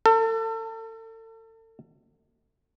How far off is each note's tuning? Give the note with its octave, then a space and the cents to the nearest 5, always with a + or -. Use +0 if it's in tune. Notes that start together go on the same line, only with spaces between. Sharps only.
A4 +35